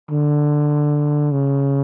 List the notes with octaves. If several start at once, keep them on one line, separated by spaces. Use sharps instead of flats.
D3
C#3